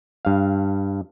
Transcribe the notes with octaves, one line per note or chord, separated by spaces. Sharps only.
G2 F5